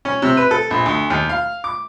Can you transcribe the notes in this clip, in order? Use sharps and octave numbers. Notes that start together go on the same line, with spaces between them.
C#4
C3
B4
A4
A#1
D2
D#2
F5
D6